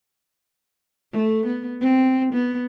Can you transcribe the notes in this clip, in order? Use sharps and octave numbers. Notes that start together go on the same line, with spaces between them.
A3
B3
C4
B3